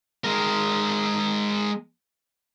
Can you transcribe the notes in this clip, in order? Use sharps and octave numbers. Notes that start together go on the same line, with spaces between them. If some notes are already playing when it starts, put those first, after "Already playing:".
G#3 A#4